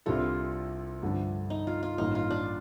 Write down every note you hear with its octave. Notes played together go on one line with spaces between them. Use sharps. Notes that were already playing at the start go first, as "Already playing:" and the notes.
C2 C3 G3 D4 F4 A4
G2 D3 F3 A3 D4
D#4
F4
F4
A1 G2 D#3 A#3 D#4
F4
D4